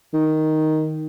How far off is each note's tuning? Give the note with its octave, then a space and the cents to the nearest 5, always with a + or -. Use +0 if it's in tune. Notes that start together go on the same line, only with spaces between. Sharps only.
D#3 +5